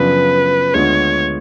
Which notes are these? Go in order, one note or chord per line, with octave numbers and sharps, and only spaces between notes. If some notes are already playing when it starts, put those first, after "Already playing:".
Already playing: F#2 C#3 F3 B3 D4 B4
D2 D3 G#3 B3 F4 C#5